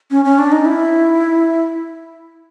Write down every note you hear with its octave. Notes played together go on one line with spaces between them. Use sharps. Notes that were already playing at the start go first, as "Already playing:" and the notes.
C#4
C#4
D4
D#4
E4